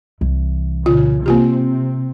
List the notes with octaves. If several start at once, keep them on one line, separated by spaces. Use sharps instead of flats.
C2 E3
A#2 C#3 F4
C3 A#3 C4 F4 G4